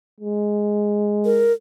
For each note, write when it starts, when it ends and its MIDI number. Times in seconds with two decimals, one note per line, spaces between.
0.20 1.52 56
1.25 1.52 70